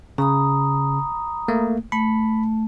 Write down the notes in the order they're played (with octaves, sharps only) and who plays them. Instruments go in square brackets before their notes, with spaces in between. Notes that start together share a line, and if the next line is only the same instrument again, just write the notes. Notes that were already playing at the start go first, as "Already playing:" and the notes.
[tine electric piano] C#3 [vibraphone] A#5 B5 D#6
[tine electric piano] A3 A#3
[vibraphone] A3 [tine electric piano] B5